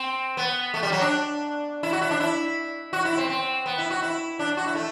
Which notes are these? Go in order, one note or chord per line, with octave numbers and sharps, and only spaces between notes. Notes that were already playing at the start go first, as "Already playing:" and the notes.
Already playing: C4
B3
A3
G3
F#3
D4
E4
F#4
E4
D4
E4
F#4
E4
C4
C4
B3
E4
F#4
E4
D4
F#4
E4
A3